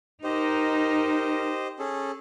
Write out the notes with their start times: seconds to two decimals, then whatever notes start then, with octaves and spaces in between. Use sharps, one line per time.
0.24 D#4 G4 A#4 C5 D#5
1.79 C#4 G#4 A4